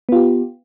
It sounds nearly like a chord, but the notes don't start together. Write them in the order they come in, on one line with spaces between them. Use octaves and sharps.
B3 F4 G4